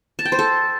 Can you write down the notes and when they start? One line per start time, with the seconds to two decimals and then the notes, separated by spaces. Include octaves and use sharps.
0.19 A5
0.25 G5
0.32 C5
0.39 A4